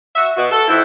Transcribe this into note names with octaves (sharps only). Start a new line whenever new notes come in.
F#4 E5
B2 F#4
A4
F2 C4 E4